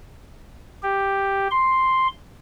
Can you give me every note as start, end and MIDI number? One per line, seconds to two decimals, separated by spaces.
0.83 1.48 67
1.51 2.08 84